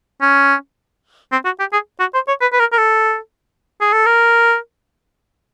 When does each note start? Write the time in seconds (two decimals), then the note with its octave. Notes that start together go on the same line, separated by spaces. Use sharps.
0.22 C#4
1.32 C4
1.45 F#4
1.60 G4
1.73 G#4
2.00 F#4
2.14 C5
2.28 C#5
2.41 B4
2.53 B4
2.59 A#4
2.72 A#4
2.78 A4
3.81 G#4
3.93 A4
4.06 A#4